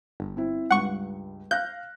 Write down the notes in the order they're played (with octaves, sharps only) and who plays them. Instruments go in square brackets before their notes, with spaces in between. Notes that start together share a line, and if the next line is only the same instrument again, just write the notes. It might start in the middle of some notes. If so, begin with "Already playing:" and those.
[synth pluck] G1
[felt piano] C4 E4
[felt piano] C#2 G2 [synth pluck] F#5 C#6
[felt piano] F5 F#6 A#6 [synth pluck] G6